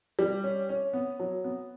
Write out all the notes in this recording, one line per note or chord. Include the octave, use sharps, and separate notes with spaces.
G3
C#4
C#4
B3
F#3
B3